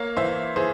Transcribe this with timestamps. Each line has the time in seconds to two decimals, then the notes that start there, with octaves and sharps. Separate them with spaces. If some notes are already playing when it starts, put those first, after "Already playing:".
Already playing: A#3 C#5 F5
0.17 E3 C5 E5
0.56 E3 G#4 C5